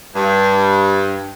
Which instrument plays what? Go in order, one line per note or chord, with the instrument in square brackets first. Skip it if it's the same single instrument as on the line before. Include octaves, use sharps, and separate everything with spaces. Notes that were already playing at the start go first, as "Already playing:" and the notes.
[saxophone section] G2